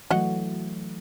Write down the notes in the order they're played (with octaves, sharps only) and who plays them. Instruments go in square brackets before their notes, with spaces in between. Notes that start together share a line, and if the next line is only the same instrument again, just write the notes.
[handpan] E3 F#3 A3 [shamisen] F#4 D#5 F#5